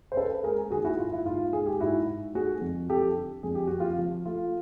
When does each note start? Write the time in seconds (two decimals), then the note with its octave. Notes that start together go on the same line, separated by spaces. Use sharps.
0.12 C5
0.16 C#4 A4 B4
0.44 G#3 G#4 A#4
0.71 D#3 F#4 G#4
0.85 E4 F#4
0.98 G#2 F4
1.12 E4
1.25 G#2 F4
1.53 G#3 G#4
1.66 G4
1.80 G#2 E4 F#4
2.07 G#2
2.34 A3 F#4 G#4
2.62 F2
2.89 F2 G4 A4
3.17 D3
3.43 F2 G#4
3.55 G4
3.67 F2 F#4
3.80 F4 G4
3.99 F3
4.25 A3 F4